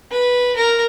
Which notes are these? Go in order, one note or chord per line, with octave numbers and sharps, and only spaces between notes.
B4
A#4